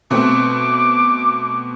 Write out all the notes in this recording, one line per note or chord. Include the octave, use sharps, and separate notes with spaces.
B2 A3 C4 D6